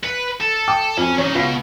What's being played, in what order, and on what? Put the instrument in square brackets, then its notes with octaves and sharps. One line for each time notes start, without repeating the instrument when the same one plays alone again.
[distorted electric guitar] B4 [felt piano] C#7
[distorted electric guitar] A4
[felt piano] G5 D6 D#6
[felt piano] F2 [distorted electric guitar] C#4 G#5
[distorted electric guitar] E3 D#4 [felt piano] C#4
[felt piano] C#2 F5 [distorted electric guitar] B2